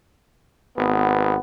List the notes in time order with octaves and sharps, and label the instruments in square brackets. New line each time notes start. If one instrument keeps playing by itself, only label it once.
[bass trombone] G#1 [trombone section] B3